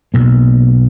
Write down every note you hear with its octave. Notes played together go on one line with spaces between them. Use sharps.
B1 B2 A#3